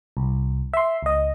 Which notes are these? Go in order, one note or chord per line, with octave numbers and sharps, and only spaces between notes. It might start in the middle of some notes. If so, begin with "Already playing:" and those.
C2
E5 C6
C#2 D#5